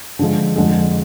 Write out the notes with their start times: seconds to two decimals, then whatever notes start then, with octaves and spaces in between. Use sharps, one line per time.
0.19 D3 F3 G#3
0.56 F2 D3 G#3